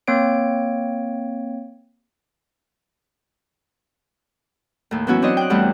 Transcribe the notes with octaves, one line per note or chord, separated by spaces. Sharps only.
A#3 C4 C#5 D7
D#2 A2
E3 F#3 B3 C#4 E4 F#4
F#3 C4 D4 C#5 D#5
G5 F#6
E2 E3 G3 A3 F#5